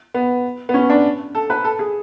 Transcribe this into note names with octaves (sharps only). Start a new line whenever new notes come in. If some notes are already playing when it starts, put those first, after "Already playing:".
B3
B3
C#4
D4
A4
B4
A4
G#4